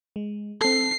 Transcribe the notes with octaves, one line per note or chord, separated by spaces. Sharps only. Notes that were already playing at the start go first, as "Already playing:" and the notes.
G#3
C4 A4 C7